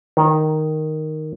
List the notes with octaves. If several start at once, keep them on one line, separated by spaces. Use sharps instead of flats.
D#3